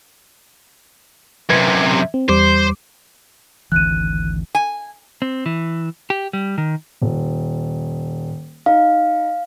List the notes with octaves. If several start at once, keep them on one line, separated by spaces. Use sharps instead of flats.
F#2 C3 B4 G#6
C4
E2 G3 C5 D6
G#1 D2 E3 F#6 D#7
G#5
C4
E3
G4
G3
D#3
D#1
D#4 F5